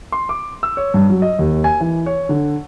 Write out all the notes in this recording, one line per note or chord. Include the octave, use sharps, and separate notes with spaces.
C6
D6
E6
C#5
G2
F#3
D#5
D#2
G#5
E3
C#5
D3